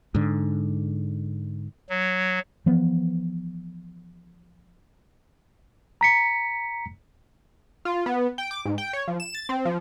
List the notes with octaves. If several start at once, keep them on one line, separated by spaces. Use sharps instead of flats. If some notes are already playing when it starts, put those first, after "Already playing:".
G#2 D3
F#3
E3 F3 B3
A#5 B6 C#7
F4
B3
G5
D6
G#2
G5
C#5
F3
E7
A6
C4
F3